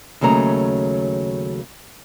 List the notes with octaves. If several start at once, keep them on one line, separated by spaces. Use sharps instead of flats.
D#2 C#3 F#3 A3 A#5